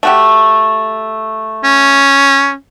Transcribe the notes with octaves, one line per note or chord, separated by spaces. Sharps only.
A3 F#4 G4
C#4